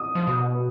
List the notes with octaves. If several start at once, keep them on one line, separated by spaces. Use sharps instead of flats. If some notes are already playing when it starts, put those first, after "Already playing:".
Already playing: D#6
F3
B2